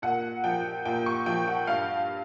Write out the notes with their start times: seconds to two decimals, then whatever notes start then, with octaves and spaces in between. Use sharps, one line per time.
0.02 A#2 F#5
0.44 F3 G5
0.85 A#2 G5
1.06 C#6
1.26 F3 G5
1.47 F#5
1.67 G2 F5